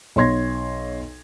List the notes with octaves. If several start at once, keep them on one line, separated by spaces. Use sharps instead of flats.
B1 C#5 C6 G#6 A#6